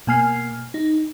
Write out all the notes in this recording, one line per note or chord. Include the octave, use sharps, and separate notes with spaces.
B2 A#3 G#5 F6 C7
D#4